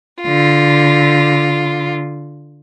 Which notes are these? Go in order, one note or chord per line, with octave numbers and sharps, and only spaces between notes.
D3 F4